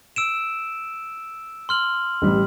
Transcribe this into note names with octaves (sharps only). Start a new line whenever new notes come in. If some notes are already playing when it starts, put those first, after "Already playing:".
E6 D7 E7
C6 F6 F#7
A1 G3